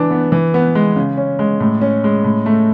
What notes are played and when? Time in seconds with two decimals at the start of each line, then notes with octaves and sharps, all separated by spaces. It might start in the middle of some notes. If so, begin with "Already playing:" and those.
Already playing: E3 D4
0.11 B3
0.32 E3
0.54 B3
0.75 G#3
0.96 C#3
1.17 C#4
1.39 G#3
1.60 A2
1.81 C#4
2.04 G#3
2.24 A2
2.46 A3